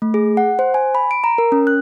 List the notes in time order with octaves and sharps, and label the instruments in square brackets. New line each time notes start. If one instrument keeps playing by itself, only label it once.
[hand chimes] A3
G#4
F#5
C5
G#5
B5
D7
A#5
A#4
C#4
F#6